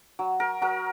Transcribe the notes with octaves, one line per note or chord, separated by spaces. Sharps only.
F#3
A#4
F#3 A#4